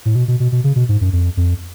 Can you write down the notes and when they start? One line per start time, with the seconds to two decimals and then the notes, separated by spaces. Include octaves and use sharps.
0.05 A2
0.15 B2
0.28 B2
0.40 B2
0.52 B2
0.64 C#3
0.76 B2
0.89 G#2
1.01 F#2
1.13 F2
1.37 F2